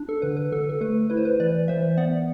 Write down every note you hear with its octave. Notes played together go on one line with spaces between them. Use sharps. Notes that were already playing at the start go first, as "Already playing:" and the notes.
Already playing: D4
A4
D3 B4
B4
D3 A4
A4
A3 B4
E4 B4
C5
B4
E3 B4 D5
E3 C5 E5
B3 D5 F#5